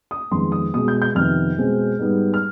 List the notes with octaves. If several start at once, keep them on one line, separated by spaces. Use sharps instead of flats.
D#6
F2 D#3 G#3 B3 C6
D#6
B2 G#3 B3 D#6
G6
G6
F2 C3 D#3 B3 F6
B2 G#3 C4
G#2 G3 B3
F6